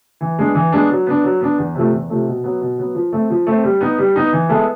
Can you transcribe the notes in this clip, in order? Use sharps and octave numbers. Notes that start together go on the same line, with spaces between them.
E3
G#3 B3 D4
E3
G#3 B3 D4
F#3
B3 D4
F#3
B3 D4
E2
C3 F3 A3
E2
C3 F3 A3
B2
F#3 B3
B2
F#3 B3
F3
A3 C4
F3
A3 C4
G3
B3 D#4
G3
B3 D#4
E3
G#3 B3 E4 A4